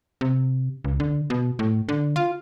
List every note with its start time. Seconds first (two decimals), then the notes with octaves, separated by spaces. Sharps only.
0.21 C3
0.84 C#2
1.00 D3
1.30 B2
1.59 A2
1.89 D3
2.16 F4